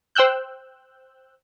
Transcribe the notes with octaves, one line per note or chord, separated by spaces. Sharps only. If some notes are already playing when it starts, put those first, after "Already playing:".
C5 G5 E6 F#6 G6